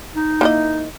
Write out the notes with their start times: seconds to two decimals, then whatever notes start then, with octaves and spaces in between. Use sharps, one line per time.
0.15 D#4
0.41 A#3 E4 D#5